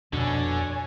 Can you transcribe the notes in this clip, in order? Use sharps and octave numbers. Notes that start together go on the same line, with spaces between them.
D#1 F2 B2 D3 D4 C#5 G#5 A5